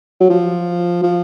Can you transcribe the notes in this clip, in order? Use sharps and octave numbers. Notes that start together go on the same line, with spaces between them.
F#3
F3
F3